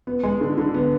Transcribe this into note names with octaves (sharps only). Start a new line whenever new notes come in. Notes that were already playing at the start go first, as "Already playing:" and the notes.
B3
G#3
D3
D3
B3